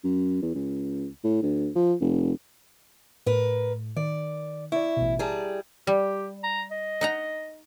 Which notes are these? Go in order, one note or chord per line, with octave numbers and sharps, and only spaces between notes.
F#2
E2
C#2
A2
D2
F3
F1
A2 A#4 B4
D#3 D5
E4 D5 C#6
A1 B2
G3 G#4 A5 A#5
G3 G4
A#5
D#5
D#4 F#5 A#5